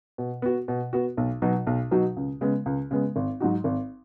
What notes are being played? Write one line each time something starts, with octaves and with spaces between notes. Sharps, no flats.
B2
B3 F#4
B2
B3 F#4
B1
B2 F#3 D#4 F#4
B1
B2 F#3 D#4 F#4
C#2
C#3 G#3 B3
C#2
C#3 G#3 B3
G#1
G#2 F#3 D#4 F#4
G#1